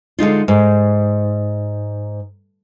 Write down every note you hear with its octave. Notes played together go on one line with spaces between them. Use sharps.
D3 G#3 D#4 F4
G#2